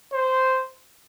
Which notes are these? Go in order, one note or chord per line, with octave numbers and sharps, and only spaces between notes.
C5